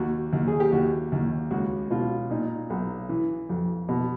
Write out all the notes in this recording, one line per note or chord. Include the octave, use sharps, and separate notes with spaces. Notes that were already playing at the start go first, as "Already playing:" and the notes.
Already playing: D#2 F#4
D#2
G#4
G4
D#2 F#4
D#2
C#2 F#4
B2 F4
A#2 D#4
B1
E3
F2
B2